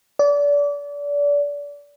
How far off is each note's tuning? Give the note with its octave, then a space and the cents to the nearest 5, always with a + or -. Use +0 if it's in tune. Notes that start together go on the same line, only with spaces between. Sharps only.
D5 -30